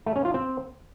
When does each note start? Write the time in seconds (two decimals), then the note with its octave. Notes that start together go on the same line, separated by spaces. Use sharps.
0.06 A3
0.16 C#4
0.25 F4
0.34 C4